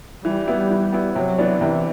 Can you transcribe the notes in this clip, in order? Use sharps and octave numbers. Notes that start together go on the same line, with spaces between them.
E3 G3
B3 E4
E3
B3 E4
C3 F#3
E3 B3 D4
C3 E3